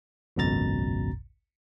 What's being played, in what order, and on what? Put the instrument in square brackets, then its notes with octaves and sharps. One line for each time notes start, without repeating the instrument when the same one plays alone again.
[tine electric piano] G#1 C#2 F#2 B2 A#5 A6